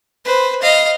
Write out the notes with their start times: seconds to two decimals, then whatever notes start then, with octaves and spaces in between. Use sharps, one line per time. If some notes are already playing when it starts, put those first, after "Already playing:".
0.25 B4 C5
0.62 D#5 F5